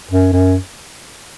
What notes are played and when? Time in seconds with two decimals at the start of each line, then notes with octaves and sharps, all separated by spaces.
0.11 F#2
0.33 F#2